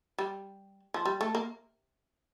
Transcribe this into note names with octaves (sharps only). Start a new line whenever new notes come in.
G3
F3
G3
A3
A#3